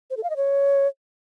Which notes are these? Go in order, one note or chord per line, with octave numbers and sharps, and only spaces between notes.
C5
A4
F5
D#5
C#5